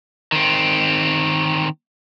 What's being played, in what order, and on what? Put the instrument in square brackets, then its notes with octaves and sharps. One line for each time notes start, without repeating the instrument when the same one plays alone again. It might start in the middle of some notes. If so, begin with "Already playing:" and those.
[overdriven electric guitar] D#3 C4